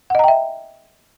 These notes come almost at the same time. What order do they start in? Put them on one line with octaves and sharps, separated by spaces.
F#5 D#5 A#5 G5 E5